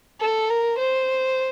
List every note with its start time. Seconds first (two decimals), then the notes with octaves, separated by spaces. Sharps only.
0.21 A4
0.50 A#4
0.79 C5